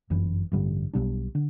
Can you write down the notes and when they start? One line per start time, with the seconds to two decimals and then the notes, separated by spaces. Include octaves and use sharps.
0.10 G1 F#2 E3
0.52 A1 G2 D3 G3
0.93 B1 B2 G3 D4
1.35 D3